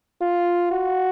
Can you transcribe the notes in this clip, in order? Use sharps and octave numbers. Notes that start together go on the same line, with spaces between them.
F4
F#4